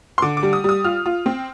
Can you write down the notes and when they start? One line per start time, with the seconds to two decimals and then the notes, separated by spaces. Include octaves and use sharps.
0.18 C6
0.22 D3 D6
0.37 D6
0.43 G3
0.53 D#6
0.64 G3 D#6
0.84 F4 F6
1.06 F4
1.26 C4